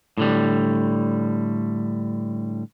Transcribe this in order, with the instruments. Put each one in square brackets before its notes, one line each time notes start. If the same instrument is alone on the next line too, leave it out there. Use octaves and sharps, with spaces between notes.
[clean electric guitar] A2 D3 G3